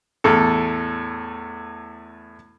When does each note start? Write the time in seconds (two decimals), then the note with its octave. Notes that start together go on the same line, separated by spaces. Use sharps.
0.24 E2 A2 A4